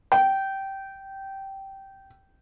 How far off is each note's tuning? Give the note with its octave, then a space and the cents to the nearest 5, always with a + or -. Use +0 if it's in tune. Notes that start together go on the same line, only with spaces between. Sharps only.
G5 -15